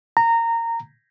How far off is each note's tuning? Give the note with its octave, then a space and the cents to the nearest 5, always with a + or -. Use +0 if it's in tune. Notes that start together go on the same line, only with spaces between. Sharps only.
A#5 -15